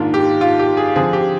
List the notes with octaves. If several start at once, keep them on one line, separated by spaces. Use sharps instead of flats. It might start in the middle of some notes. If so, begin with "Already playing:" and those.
Already playing: G#2 D#3 A#3 D4 F4
G4
F4
G4
G#4
D3 F3 C4 G#4
G4